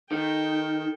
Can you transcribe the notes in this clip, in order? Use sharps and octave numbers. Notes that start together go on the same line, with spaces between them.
D#3 A4 G5